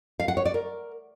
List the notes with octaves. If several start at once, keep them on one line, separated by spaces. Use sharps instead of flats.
F5
F#5
C#5
D5
A#4